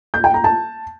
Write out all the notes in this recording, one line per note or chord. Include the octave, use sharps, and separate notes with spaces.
G6
G5
A#5
A5